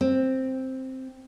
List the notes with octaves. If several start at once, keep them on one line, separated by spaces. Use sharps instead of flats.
C4